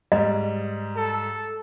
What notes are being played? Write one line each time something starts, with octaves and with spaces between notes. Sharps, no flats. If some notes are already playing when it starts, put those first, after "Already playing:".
G#2 G3 D#5
A4